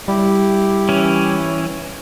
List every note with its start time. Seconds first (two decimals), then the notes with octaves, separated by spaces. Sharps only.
0.08 G3 E4 G4
0.89 E3 C#4